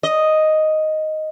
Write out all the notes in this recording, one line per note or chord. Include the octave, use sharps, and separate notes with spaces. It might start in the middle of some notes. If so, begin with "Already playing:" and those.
D#5